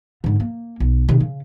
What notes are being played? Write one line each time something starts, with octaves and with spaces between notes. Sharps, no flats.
G#2 D3
A#3
B1
C3 D#3
C#3